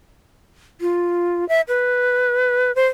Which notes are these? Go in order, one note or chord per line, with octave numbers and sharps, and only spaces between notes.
F4
E5
B4
C5